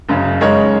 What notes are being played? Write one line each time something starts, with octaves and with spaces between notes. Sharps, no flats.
F#1 F#2 C#3
C#3 G#3 D#4 A#4 C#5